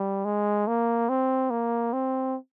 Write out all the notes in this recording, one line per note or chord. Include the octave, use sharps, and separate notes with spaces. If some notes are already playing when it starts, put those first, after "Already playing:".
Already playing: G3
G#3
A#3
C4
A#3
C4